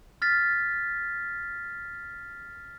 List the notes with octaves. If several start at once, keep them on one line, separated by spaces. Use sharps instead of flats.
F6 A6 B6